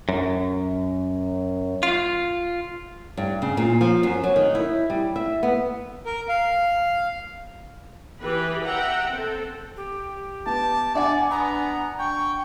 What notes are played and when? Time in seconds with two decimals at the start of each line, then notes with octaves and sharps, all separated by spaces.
0.09 F#2
1.83 F4
3.17 G2
3.42 C#3
3.57 A#2
3.81 F3
4.03 F#2
4.24 F#3
4.36 D#3
4.55 E4
4.90 G3
5.16 E5
5.43 B3
6.06 A#4
6.29 F5
8.21 E3 G4 G#4 B4 B5
8.65 E5 F#5 G5 A#5
9.10 C4 A4
9.76 G4
10.46 B3 A5
10.95 D4 D5 F#5 G#5
11.31 B3 A#5
11.99 G5 C#6